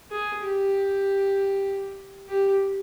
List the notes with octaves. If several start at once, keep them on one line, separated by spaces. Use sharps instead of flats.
G#4
G4
G4